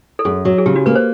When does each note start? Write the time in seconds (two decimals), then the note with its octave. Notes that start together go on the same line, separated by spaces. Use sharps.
0.19 A4
0.25 F#2 G#4
0.45 F#3
0.58 G#4
0.66 C#3 G4
0.76 F#4
0.86 A#3 B4
0.95 C5